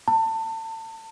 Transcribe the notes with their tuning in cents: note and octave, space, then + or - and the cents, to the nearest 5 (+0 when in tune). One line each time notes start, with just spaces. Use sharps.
A5 +30